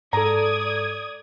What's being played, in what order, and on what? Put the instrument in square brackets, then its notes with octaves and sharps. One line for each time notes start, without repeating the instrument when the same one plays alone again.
[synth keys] G#2 A4 [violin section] D5 D#6 G#6 [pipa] A#5